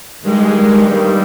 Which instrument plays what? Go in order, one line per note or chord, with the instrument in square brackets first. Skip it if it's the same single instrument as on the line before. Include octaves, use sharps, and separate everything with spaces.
[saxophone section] G2 D#3 G3 A#3 [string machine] G#3
[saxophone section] G2 D#3 G3 A#3